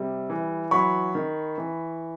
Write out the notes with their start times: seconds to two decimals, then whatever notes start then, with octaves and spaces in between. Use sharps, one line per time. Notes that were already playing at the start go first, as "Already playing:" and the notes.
Already playing: C3 G3
0.30 E3
0.71 F#3 B5 C#6
1.15 D#3
1.58 E3